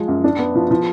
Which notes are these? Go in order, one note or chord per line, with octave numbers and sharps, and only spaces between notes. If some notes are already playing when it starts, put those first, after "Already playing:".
Already playing: F3 G#3
F#2
D4
B3
F3
F3